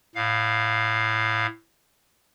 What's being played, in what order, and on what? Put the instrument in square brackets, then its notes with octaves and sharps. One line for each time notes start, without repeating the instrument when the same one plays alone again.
[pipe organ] A2 F5